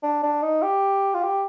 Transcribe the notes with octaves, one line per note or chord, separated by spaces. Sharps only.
D4
D4
D#4
G4
F4
G4